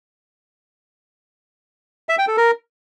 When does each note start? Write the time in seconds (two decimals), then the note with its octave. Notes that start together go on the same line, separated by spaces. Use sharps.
2.09 E5
2.18 G5
2.28 A4
2.37 A#4